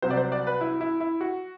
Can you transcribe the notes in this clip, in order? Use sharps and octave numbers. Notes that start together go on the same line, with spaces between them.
C2 C3 F#3 C5
D5
C5
D5
B4
E4
E4
E4
F#4